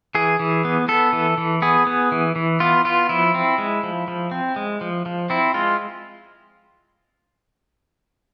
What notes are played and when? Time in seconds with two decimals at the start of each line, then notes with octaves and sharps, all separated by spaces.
0.15 E3 G#4
0.39 E3
0.65 B3
0.88 B3 A4
1.13 E3
1.38 E3
1.62 B3 G#4
1.87 B3
2.12 E3
2.36 E3
2.60 B3 F4
2.85 B3 F4
3.09 F3 E4
3.34 C4
3.58 G#3
3.83 F3
4.08 F3
4.31 C4
4.56 G#3
4.81 F3
5.06 F3
5.30 C4 E4
5.54 G#3 F4